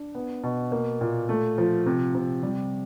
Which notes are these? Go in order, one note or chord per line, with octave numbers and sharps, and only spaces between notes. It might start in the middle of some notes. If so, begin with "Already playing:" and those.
Already playing: D4
B3
B2
A#3
A#2
A3
F3
C3
C3
G3